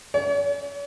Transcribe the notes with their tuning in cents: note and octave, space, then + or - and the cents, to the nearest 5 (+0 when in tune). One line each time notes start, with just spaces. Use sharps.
C#5 +45